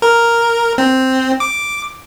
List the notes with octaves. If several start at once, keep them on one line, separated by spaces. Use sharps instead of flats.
A#4
C4
D6